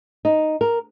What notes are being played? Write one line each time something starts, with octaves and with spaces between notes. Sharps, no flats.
D#4
A#4